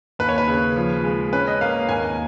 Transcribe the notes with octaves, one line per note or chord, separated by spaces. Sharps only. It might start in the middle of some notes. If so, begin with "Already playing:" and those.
D#2 B4
C#5
B4
C#3
F3
G#3
C#4 B4
D#5
A#3 F5
D#2 G#5